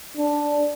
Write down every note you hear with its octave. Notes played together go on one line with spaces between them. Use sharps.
D4